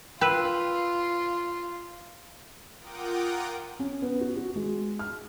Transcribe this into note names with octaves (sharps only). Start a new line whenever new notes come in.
F4 B4 G5 E6
F4 A#4 F#5 G5 D6 D#6
C#4
B3
F#4
F#4
G#3
F6